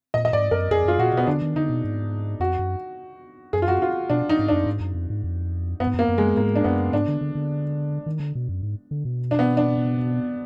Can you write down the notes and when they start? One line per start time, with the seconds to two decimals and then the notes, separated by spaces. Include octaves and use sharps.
0.14 A#2 D#5
0.25 D#5
0.33 G#2 D5
0.51 F#2 A#4
0.71 F2 G#4
0.85 F#2 F4
0.98 A#2 F#4
1.13 B2 B3
1.27 D3 D4
1.42 D#3
1.56 D3 D#4
1.69 B2
1.84 G#2
2.40 F2 F#4
2.59 F#2
3.53 F#2 G#4
3.62 F4
3.68 F#4
3.82 F4
4.10 B2 D4
4.29 D#4
4.39 G#2
4.48 D4
4.52 F#2
4.66 G#2
4.80 F#2
4.94 F2
5.10 G#2
5.24 F2
5.80 F#2 B3
5.87 G#2
5.94 F#2 A#3
6.08 F#2
6.18 G#3
6.37 G#2 A#3
6.56 D4
6.64 F#2 B3
6.93 G#2 D4
7.08 D3
7.21 D3
7.35 D3
8.06 D#3
8.20 D3
8.35 B2
8.49 F#2
8.63 G#2
8.91 D3
9.05 B2
9.31 D4
9.39 B3
9.57 D4